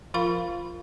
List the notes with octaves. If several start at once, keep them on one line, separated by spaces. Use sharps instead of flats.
F3 F4 A#4 F5 B5 C6